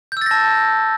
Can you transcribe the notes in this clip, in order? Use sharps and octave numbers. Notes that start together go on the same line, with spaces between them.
A5 E6 G6 A6 A#6